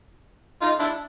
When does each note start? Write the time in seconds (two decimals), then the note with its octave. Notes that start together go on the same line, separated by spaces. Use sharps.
0.62 D#4 F4
0.79 D4 E4